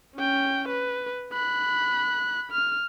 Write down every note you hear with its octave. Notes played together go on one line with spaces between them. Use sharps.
C#4 G5
B4
B5 F#6
F6